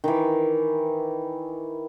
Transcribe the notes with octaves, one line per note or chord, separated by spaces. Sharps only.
D#3 E3